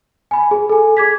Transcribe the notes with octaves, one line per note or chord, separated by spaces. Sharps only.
G#5 B5
G#4
A4 G#5
G#4 D6 G#6 B6